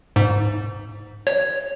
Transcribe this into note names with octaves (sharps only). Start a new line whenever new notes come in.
G#2
C#5